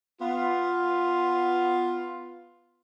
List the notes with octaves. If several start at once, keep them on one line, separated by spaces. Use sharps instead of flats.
B3 F4